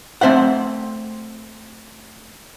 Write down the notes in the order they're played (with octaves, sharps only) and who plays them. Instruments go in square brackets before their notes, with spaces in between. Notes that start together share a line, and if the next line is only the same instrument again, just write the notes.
[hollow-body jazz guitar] A3 C4 C5 E5 F#5